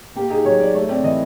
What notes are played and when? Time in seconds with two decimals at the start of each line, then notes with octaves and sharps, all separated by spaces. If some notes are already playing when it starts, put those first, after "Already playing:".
0.16 A#3 G4
0.30 D#4 G#4
0.45 F#3 C#5
0.60 F#3 D5
0.74 A3 C#5
0.89 C4 D5
1.04 E3 D#5